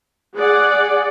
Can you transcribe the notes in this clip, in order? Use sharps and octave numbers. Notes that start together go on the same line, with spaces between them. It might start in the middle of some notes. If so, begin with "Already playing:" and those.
G#4 D5 F#5